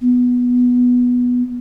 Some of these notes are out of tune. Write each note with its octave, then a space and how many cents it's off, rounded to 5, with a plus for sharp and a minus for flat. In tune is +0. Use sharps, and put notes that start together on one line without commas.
B3 -5